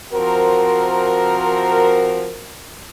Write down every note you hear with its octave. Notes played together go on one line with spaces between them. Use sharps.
F3 C4 F#4 A#4